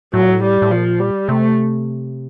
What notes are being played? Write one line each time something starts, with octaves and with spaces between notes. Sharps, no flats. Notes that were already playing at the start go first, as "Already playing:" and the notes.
A2 F#3
A#2
A2
G3
A2
A#2 F3
G3
C3 A3